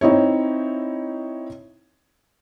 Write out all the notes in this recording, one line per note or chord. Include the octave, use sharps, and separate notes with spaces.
C4 D#4 E4 C#5